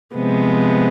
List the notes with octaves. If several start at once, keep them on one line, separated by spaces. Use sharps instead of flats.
C3 F3 G#3 B3